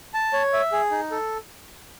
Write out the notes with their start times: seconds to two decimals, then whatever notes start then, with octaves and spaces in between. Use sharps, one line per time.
0.14 A5
0.33 C#5
0.53 E5
0.72 G#4
0.91 D#4
1.11 A4